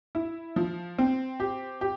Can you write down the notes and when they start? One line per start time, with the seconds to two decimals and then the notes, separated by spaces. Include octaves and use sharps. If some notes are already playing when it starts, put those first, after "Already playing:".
0.15 E4
0.56 F3
0.98 C4
1.40 G4
1.81 G4